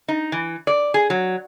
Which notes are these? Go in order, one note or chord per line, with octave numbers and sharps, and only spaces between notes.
D#4
E3
D5
G#4
F#3